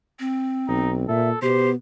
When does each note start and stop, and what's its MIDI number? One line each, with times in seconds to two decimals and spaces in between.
0.19 1.08 60
0.68 1.08 35
0.68 0.93 63
1.09 1.32 46
1.09 1.41 69
1.09 1.29 76
1.42 1.74 47
1.42 1.75 59
1.42 1.70 67
1.42 1.70 72